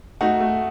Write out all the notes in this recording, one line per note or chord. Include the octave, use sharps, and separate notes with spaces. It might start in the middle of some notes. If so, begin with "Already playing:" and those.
A3 D#4 F#4
A3